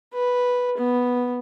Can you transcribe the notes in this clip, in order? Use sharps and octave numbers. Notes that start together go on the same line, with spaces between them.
B4
B3